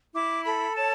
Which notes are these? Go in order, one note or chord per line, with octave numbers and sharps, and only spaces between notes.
E4 D6
A4 B5
C#5 A5